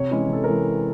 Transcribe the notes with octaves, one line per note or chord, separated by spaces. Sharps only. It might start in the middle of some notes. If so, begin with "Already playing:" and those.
Already playing: C3 C#5
E3 G#3 C#4 E4
C3 A4
E3 G#3 A#4